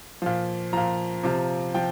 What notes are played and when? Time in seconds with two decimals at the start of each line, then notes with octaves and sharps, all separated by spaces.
0.22 A#2 F3
0.73 A#2 F3 A#5
1.23 C3 F3
1.74 F3 G5